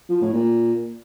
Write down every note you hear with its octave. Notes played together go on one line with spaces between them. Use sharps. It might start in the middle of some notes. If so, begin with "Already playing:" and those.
F3
A2
A#2